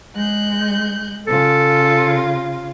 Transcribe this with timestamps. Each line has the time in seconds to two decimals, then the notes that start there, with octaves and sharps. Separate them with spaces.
0.15 G#3 F#6 G6
1.27 C#3 F4 A4